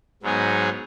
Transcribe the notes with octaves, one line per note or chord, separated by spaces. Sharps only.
G#2 F#3 B3 D#4 G#4